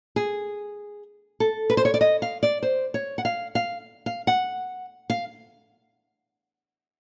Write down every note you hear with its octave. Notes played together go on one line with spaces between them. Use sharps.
G#4
A4
B4
C5
C#5
D5
D#5
F5
D5
C5
C#5
F#5
F5
F5
F5
F#5
F5